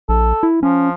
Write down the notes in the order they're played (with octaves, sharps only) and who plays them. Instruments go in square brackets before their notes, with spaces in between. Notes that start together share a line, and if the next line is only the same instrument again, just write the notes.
[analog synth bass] A#1 [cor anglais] A4
[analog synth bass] E4
[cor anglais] F3 [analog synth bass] C#4